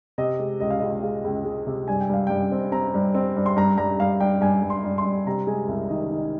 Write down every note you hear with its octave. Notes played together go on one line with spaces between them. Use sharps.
C3 D#5
G#3
C#2 D#5
F5
C#2 D#5
G#3 F5
C#2
G#3
C3
G2 G#5
G5
G2 F5
G2 G5
C4
C4 A#5
G2
C4
G2
C6
G2 A#5
G2 A#5
G2 F5
G2 G5
G2 G#5
G2
C6
G2
C6
G2
C3 A#5
G#3 G#5
C2
D#3 D#5
D#3 D#5